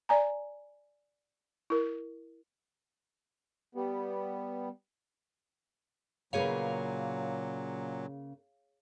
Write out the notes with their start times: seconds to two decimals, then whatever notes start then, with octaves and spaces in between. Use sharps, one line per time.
0.09 D5 G#5 A#5
1.70 E4 A#4
3.75 G3 B3
6.33 A#2 C#3 F#3 A#3 G#4 B4 C#5 F5